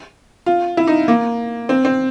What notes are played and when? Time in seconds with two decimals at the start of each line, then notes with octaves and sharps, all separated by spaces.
0.46 F4
0.77 E4
0.87 D#4
1.08 A#3
1.69 C4
1.85 C4